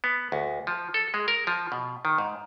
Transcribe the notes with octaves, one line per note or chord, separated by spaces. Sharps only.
B3
D2
F3
A4
G#3
A#4
F3
B2
D#3
G#2